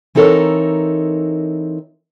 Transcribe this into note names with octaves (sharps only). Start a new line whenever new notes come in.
E3 C4 D#4 A4 A#4 C#5